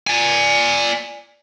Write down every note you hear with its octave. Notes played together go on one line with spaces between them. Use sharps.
D5 G#5